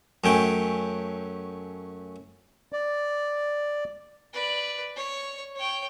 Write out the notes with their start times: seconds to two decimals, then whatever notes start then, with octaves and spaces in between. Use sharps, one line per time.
0.24 F#2 A3 C#4 G5
2.73 D5
4.33 B4 D5
4.96 C#5
5.56 C#5 G5